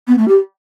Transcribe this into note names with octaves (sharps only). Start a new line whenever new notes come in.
B3
A3
G4